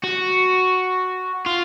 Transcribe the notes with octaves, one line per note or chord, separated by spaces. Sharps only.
F#4
F4